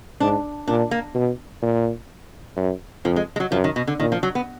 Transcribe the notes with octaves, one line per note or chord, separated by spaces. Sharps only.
G#2 D4
A#2 D4
A#3
B2
A#2
F#2
F2 F3
G#3
G#3
F#3
F#2 F3
D#3
B2
D3
A#2 D#3
F3
F#3
B3